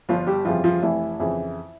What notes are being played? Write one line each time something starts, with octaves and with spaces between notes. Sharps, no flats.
G1 F3 F4
G3 G4
F2 C#3 E3 F3 G3 F4
F3 F4
F1 E3 E4
F2 C#3 E3